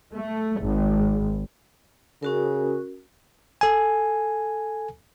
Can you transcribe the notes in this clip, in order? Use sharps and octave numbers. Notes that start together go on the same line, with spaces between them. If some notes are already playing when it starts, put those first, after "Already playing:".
A3
G#1
C#3 C#4 F#4 A#4
A4 G#5